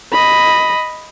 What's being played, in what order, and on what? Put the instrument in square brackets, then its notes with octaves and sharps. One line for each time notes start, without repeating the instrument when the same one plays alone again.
[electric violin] D#5 B5